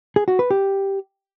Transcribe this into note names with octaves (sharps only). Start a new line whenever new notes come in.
G#4
F#4
B4
G4